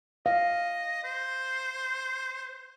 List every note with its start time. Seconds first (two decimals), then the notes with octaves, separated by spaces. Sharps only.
0.26 D#5 F5
1.04 C5